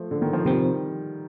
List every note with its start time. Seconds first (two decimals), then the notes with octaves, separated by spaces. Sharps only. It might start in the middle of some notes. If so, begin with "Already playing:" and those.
Already playing: F3 A3
0.11 D3
0.22 D#3
0.33 F3
0.45 C3 D#3 F3 G3 C4